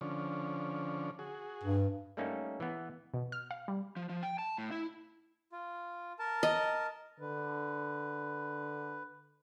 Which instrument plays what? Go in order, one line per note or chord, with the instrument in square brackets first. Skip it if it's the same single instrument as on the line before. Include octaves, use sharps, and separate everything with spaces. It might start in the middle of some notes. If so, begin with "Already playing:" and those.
[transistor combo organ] D3 F3 C#4
F#4 G#4
[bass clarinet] G2
[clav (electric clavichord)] G3 A3 A#3 C#4 D#4
E3 B3
[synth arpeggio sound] B2
F6
F5
G3
[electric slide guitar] F3
F3
G5
A5
A2
E4
[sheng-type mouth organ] F4
A#4 A5
[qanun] D#5
[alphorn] D3 [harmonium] B4